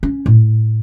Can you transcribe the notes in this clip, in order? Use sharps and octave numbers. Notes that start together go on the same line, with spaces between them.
C#4
A2